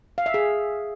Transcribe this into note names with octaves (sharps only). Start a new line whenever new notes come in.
F5
E5
G#4